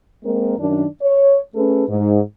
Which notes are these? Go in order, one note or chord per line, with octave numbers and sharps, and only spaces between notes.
G#3 A#3 C4 A#4
F#2 D#3 D4
C#5
A3 C#4 G#4 A4 B4
G#2